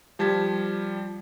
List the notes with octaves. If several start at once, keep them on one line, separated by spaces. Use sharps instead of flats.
F3 G3 A5 G#6 B6